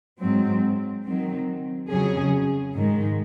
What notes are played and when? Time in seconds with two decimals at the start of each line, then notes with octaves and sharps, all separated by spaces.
0.20 G#2 F#3 C4
1.05 D#3 F#3 C4
1.90 F2 C#3 F#3 C#4 G#4
2.75 G#2 D#3 G#3